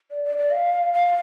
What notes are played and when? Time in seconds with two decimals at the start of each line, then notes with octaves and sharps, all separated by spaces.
0.10 D5
0.24 D5
0.38 D5
0.52 F5
0.93 F5